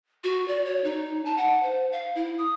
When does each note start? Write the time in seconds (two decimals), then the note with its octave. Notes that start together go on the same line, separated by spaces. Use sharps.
0.24 F#4
0.48 D5
0.65 C#5
0.84 D#4
1.25 A5
1.37 F#5
1.63 C5
1.92 F5
2.15 E4
2.38 D#6